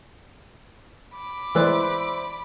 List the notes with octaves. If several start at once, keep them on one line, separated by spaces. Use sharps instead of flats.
B5 D6
E3 G#3 B4 C5 D5 E5